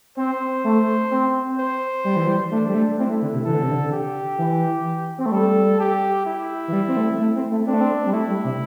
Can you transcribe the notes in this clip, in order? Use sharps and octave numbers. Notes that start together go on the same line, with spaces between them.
C4 C5
A3
C4
C5
G3
E3
G3
A3 D4
G3
A3
C4 E4
A3
D3
C3
E3 A4
D3
C3
D3
G4
E3
C4
A3
G3 A4
G4
E4
E3
G3
C4
A3
A3
C4
A3
C4 D4
A3
C4
G3
A3 E4
G3
C3